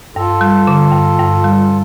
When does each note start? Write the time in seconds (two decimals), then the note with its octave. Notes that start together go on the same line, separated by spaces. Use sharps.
0.16 G2 F4 A4
0.41 G3
0.67 D3
0.92 G2
1.19 G2
1.44 G3
1.64 C#4